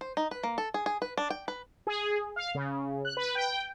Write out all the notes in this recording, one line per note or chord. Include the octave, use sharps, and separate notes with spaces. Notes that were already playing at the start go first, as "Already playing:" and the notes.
C5
D#4
B4
A#3
A4
G#4
G#4
B4
D4
G5
B4
G#4
F5
C#3
F#6
B4
G5